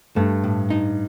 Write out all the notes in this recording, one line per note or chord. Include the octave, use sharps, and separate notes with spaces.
G2 A3
A2
D#4